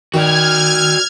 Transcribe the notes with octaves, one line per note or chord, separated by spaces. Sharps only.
D#3 F#4 D5 F6 G#6